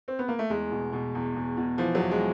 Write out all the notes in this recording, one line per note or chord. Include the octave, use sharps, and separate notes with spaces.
C4
B3
A#3
A3
E2 G#3
B2
B2
E2
E2
B2
E3 F3
E2 F#3
G#3